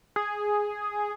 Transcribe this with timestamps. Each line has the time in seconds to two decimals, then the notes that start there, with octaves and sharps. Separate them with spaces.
0.16 G#4